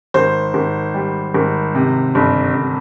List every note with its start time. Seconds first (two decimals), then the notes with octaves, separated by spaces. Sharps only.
0.14 G#1 C5
0.54 G#1
0.94 G3
1.34 G#1
1.74 C3
2.15 G1
2.54 G1